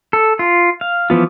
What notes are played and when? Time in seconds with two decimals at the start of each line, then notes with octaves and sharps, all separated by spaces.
0.13 A4
0.39 F4
0.81 F5
1.10 E3 F3 B3 F4